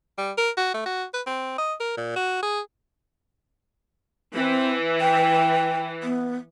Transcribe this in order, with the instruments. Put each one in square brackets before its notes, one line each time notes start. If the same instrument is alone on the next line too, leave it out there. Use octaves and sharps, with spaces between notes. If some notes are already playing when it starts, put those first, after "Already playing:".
[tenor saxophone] G3
A#4
F#4
A3
F#4
B4
C4
D#5
A#4
A#2
F#4
G#4
[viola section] E3 [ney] C4
[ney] G5
B3